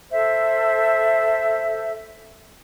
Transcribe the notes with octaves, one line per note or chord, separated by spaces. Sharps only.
A4 C5 E5